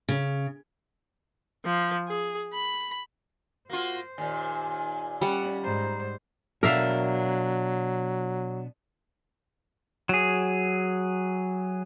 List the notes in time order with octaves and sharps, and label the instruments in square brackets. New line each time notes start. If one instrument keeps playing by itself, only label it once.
[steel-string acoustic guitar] C#3
[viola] F3
G#4
B5
[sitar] A#3 F4 [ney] F#4 [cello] C5
[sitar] D#2 A#2 [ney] G#5
[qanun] G3 F#5 [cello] C#4
[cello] G#2 C5 [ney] A#5
[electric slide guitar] B2 D4 [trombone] F#3 [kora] A#4 E5 F5
[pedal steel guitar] F#3 G#4